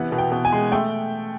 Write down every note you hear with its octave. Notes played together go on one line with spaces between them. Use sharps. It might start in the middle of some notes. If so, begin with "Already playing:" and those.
Already playing: C3 E3 B3 F#5
B2
G5
B2
G#5
G#3
A3 G5